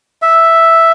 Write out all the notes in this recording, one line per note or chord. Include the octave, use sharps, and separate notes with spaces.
E5